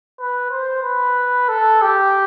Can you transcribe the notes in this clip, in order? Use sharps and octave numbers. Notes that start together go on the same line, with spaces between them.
B4
C5
B4
A4
G4